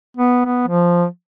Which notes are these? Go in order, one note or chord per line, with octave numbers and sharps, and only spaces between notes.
B3
B3
F3